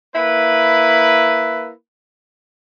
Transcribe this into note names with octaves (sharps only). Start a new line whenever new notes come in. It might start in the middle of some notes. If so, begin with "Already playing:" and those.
A#3 E4 B4